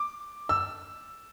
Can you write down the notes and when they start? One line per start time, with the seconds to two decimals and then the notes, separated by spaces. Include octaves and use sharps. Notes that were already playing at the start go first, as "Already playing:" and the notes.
Already playing: D6
0.49 E6